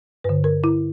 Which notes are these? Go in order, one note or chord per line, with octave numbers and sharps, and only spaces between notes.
G2 D3 B4
A#4
E4